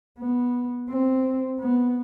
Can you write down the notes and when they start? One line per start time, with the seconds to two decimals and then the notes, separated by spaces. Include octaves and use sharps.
0.19 B3
0.89 C4
1.60 B3